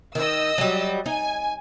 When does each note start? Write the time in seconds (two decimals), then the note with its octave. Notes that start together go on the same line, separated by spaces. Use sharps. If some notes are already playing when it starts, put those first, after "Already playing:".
0.15 D#3 D#5 E6
0.58 F#3 G3
1.06 D#4 G#5